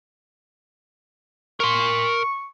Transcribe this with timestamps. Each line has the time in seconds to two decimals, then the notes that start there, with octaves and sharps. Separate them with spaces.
1.60 A#4 C6 C#6